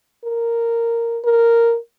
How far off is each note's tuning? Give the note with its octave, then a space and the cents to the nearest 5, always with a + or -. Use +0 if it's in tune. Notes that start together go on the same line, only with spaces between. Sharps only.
A#4 -5
A#4 -5